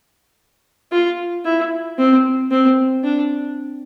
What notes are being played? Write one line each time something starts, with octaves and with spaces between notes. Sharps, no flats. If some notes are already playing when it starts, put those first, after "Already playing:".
F4
E4
C4
C4
D4